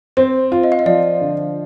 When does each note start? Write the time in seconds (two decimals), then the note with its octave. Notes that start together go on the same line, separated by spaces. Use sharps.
0.17 C4 C5
0.52 F4
0.63 D#5
0.72 F5
0.79 D#5
0.86 F3 D5
1.21 D3